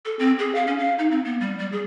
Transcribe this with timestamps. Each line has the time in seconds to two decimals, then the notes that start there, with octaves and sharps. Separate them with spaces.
0.05 A4
0.19 C4
0.39 G#4
0.55 F5
0.67 C#4
0.79 F5
0.99 D#4
1.11 C4
1.25 B3
1.41 G3
1.59 G3
1.72 G#4